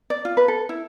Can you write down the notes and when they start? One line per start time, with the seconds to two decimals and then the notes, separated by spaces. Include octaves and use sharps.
0.10 D5
0.25 F4
0.37 B4
0.48 A4
0.69 E4